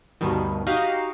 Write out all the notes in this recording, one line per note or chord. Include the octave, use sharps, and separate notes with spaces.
D2 G2 B2 D#3
D#4 F#4 G4 D#5 F5